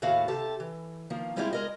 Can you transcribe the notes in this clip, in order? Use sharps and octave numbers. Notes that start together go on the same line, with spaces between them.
D#2 A2 A3 F#4 F5
C3 G4 A4 A5
E3
D#3 F3 A#3
G3 G#3 C4 E4 F4 G4
G#3 A#4 D#5